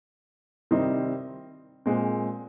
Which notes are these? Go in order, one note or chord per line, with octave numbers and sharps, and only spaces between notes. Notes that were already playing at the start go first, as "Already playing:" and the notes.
C3 D#3 G3 C4 D#4
A#2 G#3 C4